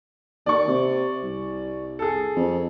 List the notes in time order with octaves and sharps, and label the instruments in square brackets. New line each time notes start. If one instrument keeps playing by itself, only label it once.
[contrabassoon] D#2 [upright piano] D5 C#6
[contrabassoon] C3
C2
[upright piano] G#4 A4
[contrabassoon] F2